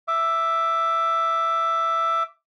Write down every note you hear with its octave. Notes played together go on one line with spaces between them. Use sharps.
E5 D6